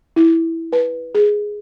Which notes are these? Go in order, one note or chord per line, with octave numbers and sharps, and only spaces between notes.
E4
B4
G#4